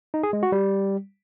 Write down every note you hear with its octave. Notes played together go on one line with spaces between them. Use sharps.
D#4
G#4
G#3
F#4
G3